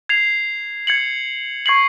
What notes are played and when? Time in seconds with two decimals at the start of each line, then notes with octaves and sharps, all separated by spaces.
0.09 G#6 C7 F7
0.87 G#6 C#7 F#7
1.66 C#6 G#6 C7 F#7